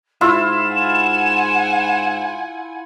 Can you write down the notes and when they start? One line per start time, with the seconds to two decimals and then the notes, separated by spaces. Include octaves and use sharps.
0.21 G#2 E4 F4 E6 E7
0.67 F#5 G#5